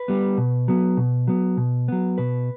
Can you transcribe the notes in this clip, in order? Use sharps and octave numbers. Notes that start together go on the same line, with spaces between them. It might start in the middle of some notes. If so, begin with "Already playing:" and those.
Already playing: B4
G3 B3
B2
F#3 B3
B2
F#3 B3
B2
F#3 B3
B2 B4